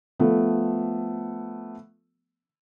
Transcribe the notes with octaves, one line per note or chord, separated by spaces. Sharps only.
F3 A3 B3